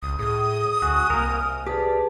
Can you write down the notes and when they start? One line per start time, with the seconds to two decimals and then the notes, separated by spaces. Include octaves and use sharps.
0.03 C#2 D#6
0.19 A2 G#4 D#6
0.82 D2 F#4 G#5
1.10 C2 A#3 A#4
1.32 F6
1.67 G4 G#4 B4 D5 A5